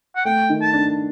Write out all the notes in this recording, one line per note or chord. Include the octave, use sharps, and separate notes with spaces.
F#5
A3 G5
D#3
A5
D4